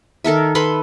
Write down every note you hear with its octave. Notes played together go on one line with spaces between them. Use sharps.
D#3 A4 A#4 E5
A4 B4 B5 C6